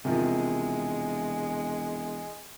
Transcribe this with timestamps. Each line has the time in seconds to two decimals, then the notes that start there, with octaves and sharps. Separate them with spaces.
0.05 E1 C3 D#3 F3 G#3